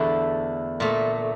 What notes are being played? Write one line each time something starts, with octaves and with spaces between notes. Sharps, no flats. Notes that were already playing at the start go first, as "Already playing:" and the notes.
Already playing: E2 D3 A3 D4 E4
A#2 A3